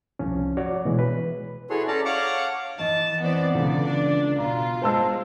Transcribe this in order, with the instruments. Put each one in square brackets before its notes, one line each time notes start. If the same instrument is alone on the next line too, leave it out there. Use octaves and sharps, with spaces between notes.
[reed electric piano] C2 F3 C#4
F#4 C#5 D5
B2 E3 G#3
B4
[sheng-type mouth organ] E4 F#4 G#4 A4 C#5 C6
C#4 A4 D5 A5 A#5
C#5 F5 F#5 A5 C#6 D6
[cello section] E3 [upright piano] D#5 [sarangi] A5
[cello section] E3 C4 D5 [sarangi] B3
[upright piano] C#2 [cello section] D3 E3 D5
[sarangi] D4
[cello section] B2 [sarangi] F4 [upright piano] A#5
[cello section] G#3 [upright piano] C5 A5 E6